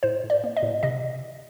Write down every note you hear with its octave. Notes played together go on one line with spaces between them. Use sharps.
A2 C5
A2
D5
A#3
D#5
A2
C3 D#5